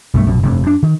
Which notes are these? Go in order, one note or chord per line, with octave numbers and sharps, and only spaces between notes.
B1 G2 A3
A#1 F#2 B2
F1 G2
F#2 D4
D#3